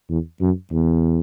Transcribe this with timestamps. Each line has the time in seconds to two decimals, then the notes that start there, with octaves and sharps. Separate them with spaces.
0.10 E2
0.41 F#2
0.72 E2